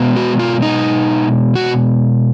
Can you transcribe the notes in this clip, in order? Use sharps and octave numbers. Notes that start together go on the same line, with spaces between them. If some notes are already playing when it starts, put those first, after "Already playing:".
Already playing: B2 G#3 B3
F#4
F4
D#4
F#4